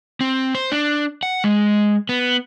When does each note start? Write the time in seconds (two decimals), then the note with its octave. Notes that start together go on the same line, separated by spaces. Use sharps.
0.21 C4
0.55 C5
0.72 D4
1.23 F#5
1.44 G#3
2.09 B3